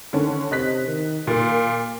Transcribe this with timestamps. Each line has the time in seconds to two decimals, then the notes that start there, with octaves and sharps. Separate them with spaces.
0.13 D3 D#3 C#4
0.51 C3 D#5 F#6 B6
0.87 D#3
1.27 A#2 A#3